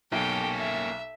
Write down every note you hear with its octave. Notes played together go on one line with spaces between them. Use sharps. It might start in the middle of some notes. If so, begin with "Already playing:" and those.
B1 A#3 C#4 G4 A4 G5
E5